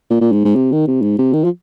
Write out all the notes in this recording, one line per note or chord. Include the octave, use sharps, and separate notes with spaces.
A#2
A#2
G#2
G#2
C3
D#3
C3
G#2
C3
D#3
F3